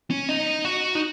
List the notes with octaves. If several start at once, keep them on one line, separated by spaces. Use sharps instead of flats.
C#4
D#4
F#4
D#4